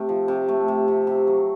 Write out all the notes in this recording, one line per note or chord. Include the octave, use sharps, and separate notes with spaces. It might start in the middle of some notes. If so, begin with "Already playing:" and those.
Already playing: C3 A3
F3
C3
A3
C3
C3
C3
F#3